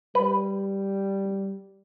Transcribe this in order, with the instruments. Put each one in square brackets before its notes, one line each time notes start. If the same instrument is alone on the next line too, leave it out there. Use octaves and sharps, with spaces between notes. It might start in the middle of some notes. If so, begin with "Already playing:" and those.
[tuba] G3 [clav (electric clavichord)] B4